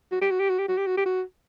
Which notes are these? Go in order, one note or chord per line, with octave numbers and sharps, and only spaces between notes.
F#4
G4
F#4
G4
F#4
G4
F#4
G4
F#4
G4
F#4